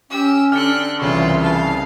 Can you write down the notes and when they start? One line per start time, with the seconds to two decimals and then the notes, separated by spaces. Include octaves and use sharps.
0.10 C#4 G4 E6
0.52 D3 G5 F6 F#6 C#7
1.00 C2 C#3 E3 F4 A4 C#6
1.42 F5 A5